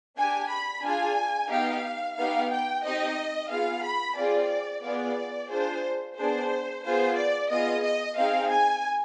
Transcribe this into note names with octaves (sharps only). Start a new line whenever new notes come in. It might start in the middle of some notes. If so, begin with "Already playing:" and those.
D4 G4 G#5
B5
D4 F4 G#4 G#5
B3 D#4 G4 F5
B3 D#4 G4 F5
G5
C4 D#4 G4 D#5
B3 F4 G#4 F5
B5
C4 F4 G#4 D5
B3 F4 G#4 D5
D4 F4 G#4 C5
B3 D4 G#4 C5
B3 F4 G#4 C5
D5
B3 F4 G#4 D#5
D#5
C4 D#4 G#4 F5
G#5